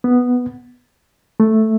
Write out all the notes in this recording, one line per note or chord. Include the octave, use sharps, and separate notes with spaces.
B3
A3